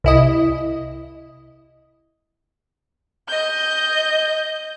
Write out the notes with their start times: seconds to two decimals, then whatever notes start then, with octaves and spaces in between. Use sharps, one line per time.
0.04 C2 E4 D#5
3.28 D#5 G6